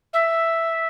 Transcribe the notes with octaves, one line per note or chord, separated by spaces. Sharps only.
E5